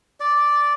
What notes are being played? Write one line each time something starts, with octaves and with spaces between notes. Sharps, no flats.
D5